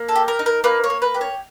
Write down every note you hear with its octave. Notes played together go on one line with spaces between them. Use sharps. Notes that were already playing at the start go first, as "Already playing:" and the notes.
Already playing: A#3
A4
G4
A#4
D#4
A#4
A#3 B4
C#5
A#3
B4
G4
C#5